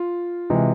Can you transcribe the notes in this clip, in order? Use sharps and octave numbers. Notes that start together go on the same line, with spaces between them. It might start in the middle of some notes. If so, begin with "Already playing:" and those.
Already playing: F4
C3 E3 G#3